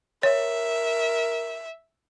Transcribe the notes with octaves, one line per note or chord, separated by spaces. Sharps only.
A#4 C#5 E5